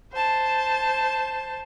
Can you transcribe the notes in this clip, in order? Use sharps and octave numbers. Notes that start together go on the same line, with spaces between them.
C5 A5